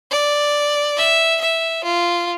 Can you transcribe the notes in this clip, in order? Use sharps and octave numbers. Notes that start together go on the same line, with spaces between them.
D5
E5
E5
F4